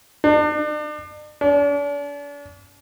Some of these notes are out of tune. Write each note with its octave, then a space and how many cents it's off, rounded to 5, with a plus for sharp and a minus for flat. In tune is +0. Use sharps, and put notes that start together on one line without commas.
D4 +40
D4 -40